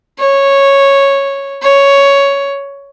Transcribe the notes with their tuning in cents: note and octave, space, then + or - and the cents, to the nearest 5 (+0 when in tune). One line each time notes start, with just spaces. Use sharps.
C#5 -5
C#5 +5